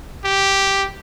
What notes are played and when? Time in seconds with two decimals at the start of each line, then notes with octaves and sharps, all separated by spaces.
0.25 G4